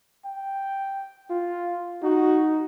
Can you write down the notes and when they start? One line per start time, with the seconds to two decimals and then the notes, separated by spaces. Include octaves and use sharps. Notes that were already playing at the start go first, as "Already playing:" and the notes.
0.25 G5
1.30 F4
2.02 D#4 F#4